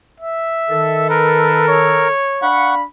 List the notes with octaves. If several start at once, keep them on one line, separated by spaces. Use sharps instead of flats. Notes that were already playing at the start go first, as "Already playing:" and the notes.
E5
D#3 A4
A#4 B4
C#5
D4 F5 F#5 B5 C#6